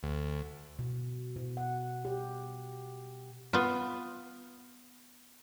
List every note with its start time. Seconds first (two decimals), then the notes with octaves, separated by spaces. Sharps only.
0.03 D2
0.79 B2
1.36 B2
1.57 F#5
2.05 G4
3.53 B3 F4